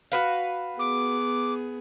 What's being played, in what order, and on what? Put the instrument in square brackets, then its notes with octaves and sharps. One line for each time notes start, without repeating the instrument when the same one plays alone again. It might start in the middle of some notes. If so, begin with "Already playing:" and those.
[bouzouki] F#4 B4 F5
[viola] B3 G#4 [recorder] D6